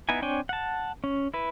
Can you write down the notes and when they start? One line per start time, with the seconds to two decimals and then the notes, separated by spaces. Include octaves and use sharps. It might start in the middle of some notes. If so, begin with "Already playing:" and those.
0.09 B3 D#4 E4 G#5
0.22 C4 D4 C#5 G5 G#5
0.49 F#5 A5
1.04 C#4
1.34 E4 B4